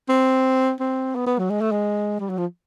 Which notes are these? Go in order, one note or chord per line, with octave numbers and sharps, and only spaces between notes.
C4
C4
B3
B3
F#3
G#3
A3
G#3
G3
F#3
F3